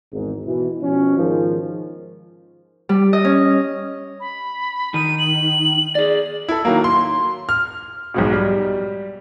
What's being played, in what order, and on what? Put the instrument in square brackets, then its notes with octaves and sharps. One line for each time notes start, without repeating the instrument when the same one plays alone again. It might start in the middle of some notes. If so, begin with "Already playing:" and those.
[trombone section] G#1 E2 G#2
B2 E3
B2 F3 C#4
G#2 D#3 F3
[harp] G3
D#5
C#4
[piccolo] B5
[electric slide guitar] D#3 [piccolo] D#7
[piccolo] F#7
[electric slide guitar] G#4 D5
[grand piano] E4 A4
D#3 F#3 A#3
C6
F6
B1 G#2 B2
G3